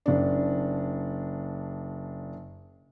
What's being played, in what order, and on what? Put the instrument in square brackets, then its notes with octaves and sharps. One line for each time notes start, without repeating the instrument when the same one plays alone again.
[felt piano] F#1 D4